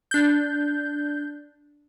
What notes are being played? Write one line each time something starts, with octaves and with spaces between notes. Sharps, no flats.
D4 G6